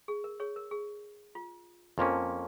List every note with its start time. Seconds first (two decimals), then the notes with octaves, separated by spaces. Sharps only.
0.08 G#4
0.24 A#4
0.40 G#4 C#5
0.56 A#4
0.71 G#4
1.35 F4
1.98 F2 F3 A#3 C#4 D#4